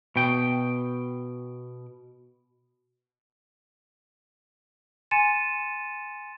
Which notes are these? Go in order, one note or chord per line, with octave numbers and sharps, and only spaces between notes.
B2 G5
G#5 C6 A6 C#7 D#7 E7